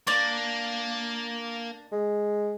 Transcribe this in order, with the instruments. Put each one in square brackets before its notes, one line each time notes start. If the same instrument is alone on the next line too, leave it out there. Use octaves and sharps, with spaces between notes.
[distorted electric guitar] A#3 [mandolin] D4 D5
[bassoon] G#3